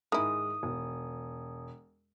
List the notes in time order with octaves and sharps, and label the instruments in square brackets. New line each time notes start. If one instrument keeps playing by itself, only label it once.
[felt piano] G#2 G#3 [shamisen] D#3 E4 [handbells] D#6
[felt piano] E1